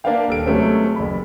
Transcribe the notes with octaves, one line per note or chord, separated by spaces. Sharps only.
A#3 D4 B4 D5 F5 G5
D#1 A4 D7
C3 F#3 G#3 A3 B3 C#4
F#1 B5